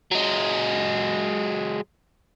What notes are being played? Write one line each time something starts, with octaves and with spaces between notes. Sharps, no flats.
F#3 G#3